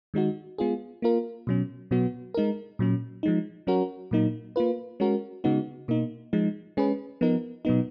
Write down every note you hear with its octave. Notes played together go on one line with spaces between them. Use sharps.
D#3 G#3 D#4 F#4
G#3 B3 F4 G#4
A#3 F4 A#4
B2 F#3 C#4
B2 F#3 B3 F#4
G#3 D#4 A#4
A#2 F#3 C#4
F3 G#3 D#4
F#3 C#4 F#4 A#4
A#2 F#3 A#3 D#4
A#3 F4 B4
G#3 C#4 F#4 A#4
C#3 G#3 B3 D#4 F#4
B2 A#3 D#4
F3 G#3 D#4
G#3 C#4 G#4 B4
F3 B3 D#4 A#4
B2 F#3 B3 D#4